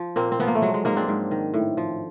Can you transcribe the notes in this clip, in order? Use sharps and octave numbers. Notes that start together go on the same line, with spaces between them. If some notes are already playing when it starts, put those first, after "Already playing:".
Already playing: F3
A#2 A#3 C4
C4
F3 B3
A#3
A3
F#3 G#3
G#3
G#2 G#3 A#3
C4 D4
G#2
D#3
A2
F3